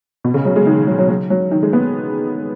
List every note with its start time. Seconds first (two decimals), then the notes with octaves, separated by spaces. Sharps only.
0.24 B2
0.34 C#3
0.45 F#3
0.56 G#3
0.66 D#3
0.87 F#3
0.98 F#3
1.09 F#3
1.30 F#3
1.51 D#3
1.63 G#3
1.73 B3